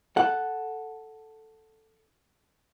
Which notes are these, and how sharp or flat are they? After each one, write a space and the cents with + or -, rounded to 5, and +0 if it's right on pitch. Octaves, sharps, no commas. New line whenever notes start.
A4 +0 F#5 +0